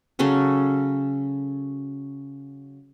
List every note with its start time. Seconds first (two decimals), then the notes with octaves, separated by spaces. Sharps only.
0.19 C#3 F#3 C#4 A4